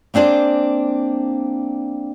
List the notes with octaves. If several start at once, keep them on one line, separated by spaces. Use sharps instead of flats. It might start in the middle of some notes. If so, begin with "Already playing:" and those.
A#3 C4 D4 G#4 C5